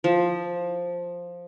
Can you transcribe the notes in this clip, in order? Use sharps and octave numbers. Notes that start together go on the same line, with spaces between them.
F3